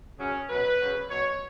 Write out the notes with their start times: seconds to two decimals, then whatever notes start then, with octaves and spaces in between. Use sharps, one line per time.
0.19 F#2 C#3 F#3 C#4
0.49 B2 F#3 B4
0.80 F#2 C#3 F#3
1.09 B2 F#3 C#5